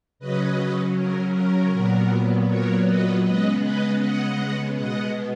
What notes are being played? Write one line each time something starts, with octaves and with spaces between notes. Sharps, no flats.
C#3 F#3 C#4 B4 D#5
A#4
A#4
A#2 F#3 B3
A#4 C#5
B4 D#5
C#3 G#3 B3 B4 D#5
B4 D#5
D#5 F#5
B2 G#3 B3 D#5 F#5